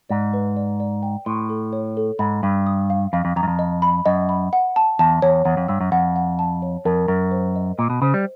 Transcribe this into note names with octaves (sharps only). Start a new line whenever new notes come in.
G#2 D5
B4
D5
D5
G5
A2 C6
A4
C#5
A4
G#2 B5
G2 B5
D#6
F5
F2 F5
F2
F2 A#5
F#2
F2
D#5
B5
F#2 D#5
B5
F#5
A5
E2 A5
E2 C#5
E2 F#5
F2
G2 E6
F#2
F2 F#5
F#5
A5
C#5
F2 A#4
F#2 A#4
C5
D#5
A#2 D#5
B2
C#3 C5
G3